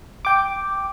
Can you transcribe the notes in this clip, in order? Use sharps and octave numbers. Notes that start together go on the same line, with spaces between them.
G5 D6